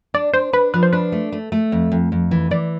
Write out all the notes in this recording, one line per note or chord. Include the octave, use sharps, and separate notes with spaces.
D4 D5
D4 C5
D4 B4
F3 B4
C5
D4 B4
A3
A3
A3
F2
F2
F2
E3
E3 D5